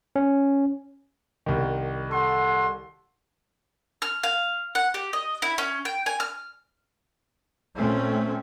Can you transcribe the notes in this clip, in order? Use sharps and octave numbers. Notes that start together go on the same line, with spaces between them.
C#4
C2 D#3
A4 F#5 C6
F6
F5
F#5
G4
D#5
E4
C#4
G5
G#5
F6
A#2 A3 C4 C#4